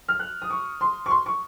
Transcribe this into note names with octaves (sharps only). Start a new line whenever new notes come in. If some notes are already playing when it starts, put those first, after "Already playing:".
F6
F#6
D#6
C#6
C6
C#6
C6
C#6